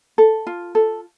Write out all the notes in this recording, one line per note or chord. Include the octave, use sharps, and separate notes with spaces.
A4
F4
A4